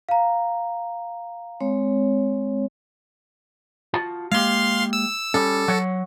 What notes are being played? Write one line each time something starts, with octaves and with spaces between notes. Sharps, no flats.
F5 A#5
G#3 C4 C#5
F4 F#4 A5
G#3 A#3 G4 F5 C6
E6
G3 C#4 A4
F#3 C#5 F#5